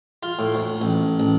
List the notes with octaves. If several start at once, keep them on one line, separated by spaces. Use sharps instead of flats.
F4
A2
D2
A1
A1